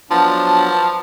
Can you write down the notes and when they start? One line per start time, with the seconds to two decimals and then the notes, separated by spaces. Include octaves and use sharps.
0.11 F3 F#3 B3 D4 A5